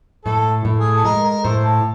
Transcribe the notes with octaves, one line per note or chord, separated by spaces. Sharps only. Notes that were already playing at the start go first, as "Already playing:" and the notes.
A2 A4
A2
G#4
A4
G#3 A#4
A#4
A2 C5
A4